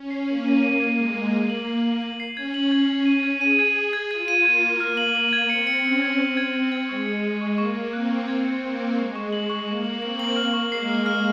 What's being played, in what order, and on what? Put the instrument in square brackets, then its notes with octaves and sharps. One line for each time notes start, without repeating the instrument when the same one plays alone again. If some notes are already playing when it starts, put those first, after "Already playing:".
Already playing: [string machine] C#4
[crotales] C7
[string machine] A#3 [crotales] F#7
[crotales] D#7
[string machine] A#3 [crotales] D#7
[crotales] G#6
[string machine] G#3 [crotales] D#7
[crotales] G#6
[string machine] A#3 [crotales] D#7
[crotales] F#7
C7
F#7
F#7
C7
[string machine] C#4 [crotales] G#6
[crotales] F#7
G#6
G#6
[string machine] C#4 [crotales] D#7
[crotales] G#6
[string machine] G#4 [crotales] D#7
[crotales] G#6
[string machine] G#4 [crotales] G#6
[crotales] G#6
[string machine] F4 [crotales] G#6
[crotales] D#7
[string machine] A#3 [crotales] G#6
[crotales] G#6
F6
F#7
[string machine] A#3 [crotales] F#7
[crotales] G#6
[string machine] C4 [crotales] C#7
[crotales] C#7
[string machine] C#4 [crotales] C#7
[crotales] G#6
[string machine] C4 [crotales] G#6
[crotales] G#6
G#6
G#6
[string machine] G#3 [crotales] C#6
[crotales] C#7
[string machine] G#3 [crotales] C#7
[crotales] C#6
[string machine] A#3 [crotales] C#6
[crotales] C#6
[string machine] C4 [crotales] F#6
[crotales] C#6
G#6
C#7
[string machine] A#3 [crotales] G#6
[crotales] G#6
[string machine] G#3 [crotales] C#6
[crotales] C#6
F#7
C#6
[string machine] A#3 [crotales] C#6
[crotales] F#7
[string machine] C4 [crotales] F#7
[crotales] F#7
[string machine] A#3 [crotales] F6
[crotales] C#6
[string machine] G#3 [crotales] C7
[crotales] F6
F6